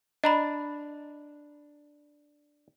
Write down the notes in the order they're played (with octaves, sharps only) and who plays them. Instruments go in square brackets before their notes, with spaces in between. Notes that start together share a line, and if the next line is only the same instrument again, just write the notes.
[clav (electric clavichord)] D4 [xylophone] D#5 A#5 B5